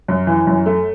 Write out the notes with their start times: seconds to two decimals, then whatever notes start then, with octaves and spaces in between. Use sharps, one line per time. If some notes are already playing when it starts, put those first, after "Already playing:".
0.08 F#2
0.27 E3
0.47 F#2
0.66 A3